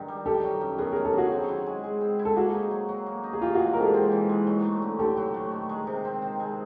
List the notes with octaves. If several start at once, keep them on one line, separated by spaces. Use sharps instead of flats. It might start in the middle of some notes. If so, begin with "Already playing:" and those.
Already playing: G2 D#3
G3
D#3 G4 A4
F#3
F#2
B3 G#4 A#4
D#3 G#4 A#4
G4 A4
F#3 F#4 G#4
C4
E4
G#3
G#3
C4
E4
A4
A#3 F#4 G#4
D#4
F#3
F#3
A#3
D#4
G#4
E3 F4 G4
G#3 F#4 G#4
A#4
G#2 G4 A4
C4
E3
G#3
F#3
A3
D3
D3 G4 A4
F#3
A3
D#3
G#3
C3
C4
D#3
G#3